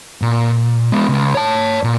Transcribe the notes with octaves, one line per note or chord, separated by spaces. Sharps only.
A#2
G#3 B3
C#2
C#5 A5
A#2